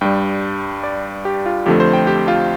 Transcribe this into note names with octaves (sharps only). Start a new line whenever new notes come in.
G2 G3 G5
D5
G4
F4
F2 D3 F3 A3 G4
C5
G5
G4
F4